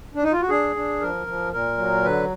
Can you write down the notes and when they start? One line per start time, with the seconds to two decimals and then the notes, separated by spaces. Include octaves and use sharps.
0.15 D4
0.24 D#4
0.33 F4
0.42 F#4
0.49 D4 G#4
0.76 D4
1.01 F3 A#4
1.27 F3
1.53 A#2 A#4
1.78 F#3
2.04 D3 B4